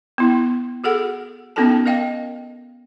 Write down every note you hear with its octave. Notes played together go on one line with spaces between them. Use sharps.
B3 E4
F#4 G#4 A4 F#5
B3 C#4 D#4 F#4 A4 A5
A#4 D#5 F5 G5